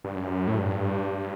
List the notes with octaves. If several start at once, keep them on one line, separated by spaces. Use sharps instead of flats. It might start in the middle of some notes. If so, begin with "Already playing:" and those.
G2
F#2
A2
G2